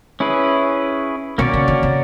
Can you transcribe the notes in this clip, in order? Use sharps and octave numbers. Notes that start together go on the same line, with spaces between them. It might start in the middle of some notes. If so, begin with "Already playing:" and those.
C#4 E4 G#4 B4
B2 A#3 C#4 F#4 A#4 D5
C#3
D3
C3